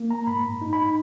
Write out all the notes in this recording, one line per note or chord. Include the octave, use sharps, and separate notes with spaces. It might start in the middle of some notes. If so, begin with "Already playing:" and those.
Already playing: A#3
A#5
G#2 B5
D#4
B5